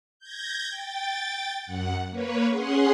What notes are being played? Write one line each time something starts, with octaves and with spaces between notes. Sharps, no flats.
G6 G#6 A#6
G5 A6
F#2 F#5
A#3 B4 C#5
C#4 G#4 F#5 C6